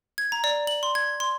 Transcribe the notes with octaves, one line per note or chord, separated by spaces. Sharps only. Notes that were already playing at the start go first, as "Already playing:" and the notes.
G#6
A#5
D5
F#7
C6
G#6
C6